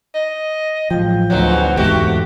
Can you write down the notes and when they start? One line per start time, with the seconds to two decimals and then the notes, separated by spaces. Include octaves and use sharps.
0.15 D#5
0.91 A1 F3 F#3 G#3 G5
1.30 D2 G#2 B2 F#3 C4
1.77 E2 G#2 A3 F#4 G4